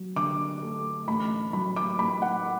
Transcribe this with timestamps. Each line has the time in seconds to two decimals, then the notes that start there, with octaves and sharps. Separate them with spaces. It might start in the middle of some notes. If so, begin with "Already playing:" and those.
Already playing: F#3
0.16 D3 D6
0.62 A3
1.08 A1 B5
1.53 F#3 B5
1.76 D6
1.99 A2 B5
2.22 F#5